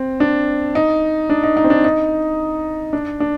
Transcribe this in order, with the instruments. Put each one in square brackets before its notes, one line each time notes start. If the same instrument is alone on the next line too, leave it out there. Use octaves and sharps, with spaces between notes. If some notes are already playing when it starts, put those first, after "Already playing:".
Already playing: [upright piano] C4
D4
D#4
D4
D#4
D#4
C4
D4
D#4
D4
D4